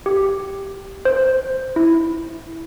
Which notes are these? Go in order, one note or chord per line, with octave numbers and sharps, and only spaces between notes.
G4
C5
E4